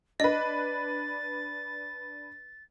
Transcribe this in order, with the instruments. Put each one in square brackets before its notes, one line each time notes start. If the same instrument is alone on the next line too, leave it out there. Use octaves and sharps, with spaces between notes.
[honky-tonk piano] D4 B4 [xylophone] D#5 [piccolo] A6